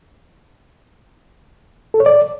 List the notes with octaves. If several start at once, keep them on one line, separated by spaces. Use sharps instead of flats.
A4
C#5
D5